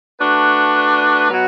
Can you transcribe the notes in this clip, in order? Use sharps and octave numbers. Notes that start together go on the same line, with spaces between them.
A3 D4 F#4 B4
B2 F#3 B3 F#4